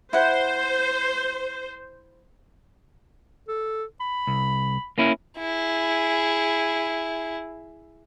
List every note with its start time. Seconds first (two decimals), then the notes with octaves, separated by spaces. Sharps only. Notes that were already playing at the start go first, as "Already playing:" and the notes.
0.13 E4 C5 F#5
3.48 A4
4.00 B5
4.27 C2
4.98 A#3 C#4 E4
5.38 E4 G#4